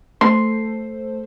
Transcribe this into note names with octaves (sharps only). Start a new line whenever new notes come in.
A3 A4 C5 C6